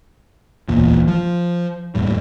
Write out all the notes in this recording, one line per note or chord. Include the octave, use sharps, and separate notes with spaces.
D1 A1 E2 A#2
F3
F1 D#2 A2 G3